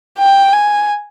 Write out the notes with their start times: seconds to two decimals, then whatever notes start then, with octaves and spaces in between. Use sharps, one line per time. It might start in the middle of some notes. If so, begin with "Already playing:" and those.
0.18 G5
0.53 G#5